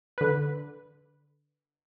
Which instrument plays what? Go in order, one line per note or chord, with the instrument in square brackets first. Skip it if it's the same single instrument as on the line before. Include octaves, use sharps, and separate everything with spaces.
[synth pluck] D3 B4